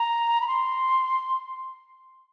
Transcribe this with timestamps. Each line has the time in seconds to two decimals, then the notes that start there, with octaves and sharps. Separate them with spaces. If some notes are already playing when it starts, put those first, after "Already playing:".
Already playing: A#5
0.41 B5
0.47 C6